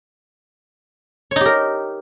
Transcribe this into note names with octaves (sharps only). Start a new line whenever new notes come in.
D#4 G4 A#4 C#5